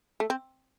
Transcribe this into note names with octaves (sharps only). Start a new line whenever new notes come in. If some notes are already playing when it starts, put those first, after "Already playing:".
A3
C4